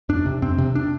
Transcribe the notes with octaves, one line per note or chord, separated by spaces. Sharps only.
F2 D4
C3
F2 C4
C3
D4